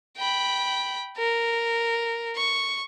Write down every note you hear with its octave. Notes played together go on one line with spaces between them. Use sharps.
G5 B5
A#4
C#6